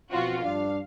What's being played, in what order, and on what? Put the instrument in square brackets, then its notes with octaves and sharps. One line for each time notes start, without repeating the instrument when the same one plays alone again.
[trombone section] B2 C4 [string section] F3 F4 F#4
[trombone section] G2 D4 [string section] F5